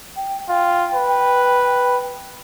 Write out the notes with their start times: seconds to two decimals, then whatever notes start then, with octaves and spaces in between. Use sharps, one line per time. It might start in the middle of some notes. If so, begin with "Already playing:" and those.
0.16 G5
0.49 F4 G5
0.95 B4